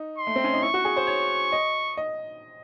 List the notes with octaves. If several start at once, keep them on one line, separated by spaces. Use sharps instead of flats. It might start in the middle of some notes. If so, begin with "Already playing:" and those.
Already playing: D#4
C6
A3
C4
C#4
D#4
E4 C#6
F#4
G#4
C5
C#5
D#5
D#5